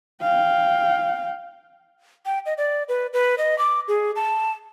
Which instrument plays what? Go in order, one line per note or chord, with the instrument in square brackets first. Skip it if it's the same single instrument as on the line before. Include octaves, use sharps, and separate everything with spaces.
[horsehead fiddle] F5 G5
[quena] G5
D#5
D5
B4
B4
D#5
D6
G#4
A5